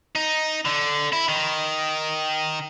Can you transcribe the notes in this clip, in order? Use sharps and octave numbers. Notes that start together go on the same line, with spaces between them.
D#4
D3
E4
D#3